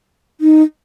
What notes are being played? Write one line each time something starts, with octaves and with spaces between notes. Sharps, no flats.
D#4